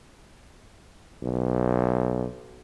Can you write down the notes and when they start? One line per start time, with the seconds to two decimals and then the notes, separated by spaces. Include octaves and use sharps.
1.23 B1